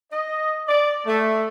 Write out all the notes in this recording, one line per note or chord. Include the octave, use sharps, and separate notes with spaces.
D#5
D5
A3